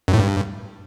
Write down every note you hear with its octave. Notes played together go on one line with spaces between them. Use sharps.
F#2
A2
G2